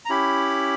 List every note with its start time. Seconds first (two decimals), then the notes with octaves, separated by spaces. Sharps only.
0.05 A#5
0.09 C#4 E4 G4 B5